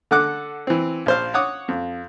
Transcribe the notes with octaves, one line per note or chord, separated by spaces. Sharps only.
D3 A4 F#5 D6 F#6
E3 C4
A#1 C5 F5
C#5 F#5 D6 D#6
F2